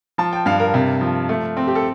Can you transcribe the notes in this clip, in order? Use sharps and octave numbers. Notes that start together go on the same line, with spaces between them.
F3 A5
G5
G2 F5
A#4
C3
F3
A3
C4
G4
A4